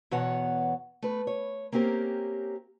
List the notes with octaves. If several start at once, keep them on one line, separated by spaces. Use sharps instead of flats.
E2 B2 B3 C#5 F#5
A3 B4
C#5
A#3 C4 C#4 G4 A#4